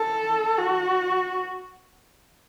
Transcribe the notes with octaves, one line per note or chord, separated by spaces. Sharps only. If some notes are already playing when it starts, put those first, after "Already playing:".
Already playing: A4
F#4